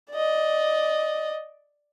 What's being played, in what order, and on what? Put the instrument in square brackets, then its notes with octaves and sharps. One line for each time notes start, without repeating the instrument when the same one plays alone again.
[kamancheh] D5 D#5